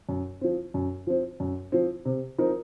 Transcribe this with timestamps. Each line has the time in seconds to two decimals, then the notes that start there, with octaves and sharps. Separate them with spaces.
0.09 F#2
0.41 F3 C4
0.74 F#2
1.07 F3 C4
1.40 F#2
1.72 F3 C4
2.05 C3
2.38 F3 C4 D#4 A#4